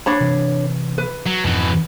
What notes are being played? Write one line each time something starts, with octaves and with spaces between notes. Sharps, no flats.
D4 C#5 B5
C3 E3
B4
F#3
F2 G#2 B2 E3